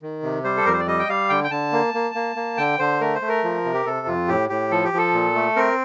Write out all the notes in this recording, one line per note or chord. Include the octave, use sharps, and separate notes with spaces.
D#3
C3
G3 C5
A4
F2 A#4
C5
D5
G3 D#5
G5
G3 F5
D3 G5
G5
D3 A5
A#3
A#3
A#3
A#3
D3 G5
D3 C5
A3 A#4
C5
A3
A#4
F3
C3
G4
C3 A4
F2 F4
A2 G4
A2 G4
F3 A4
G4
F3
A4
A#2
A3
C4 A#4